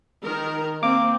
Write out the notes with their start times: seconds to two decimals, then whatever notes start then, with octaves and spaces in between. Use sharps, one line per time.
0.23 D#3 A#4
0.83 A#3 C4 D6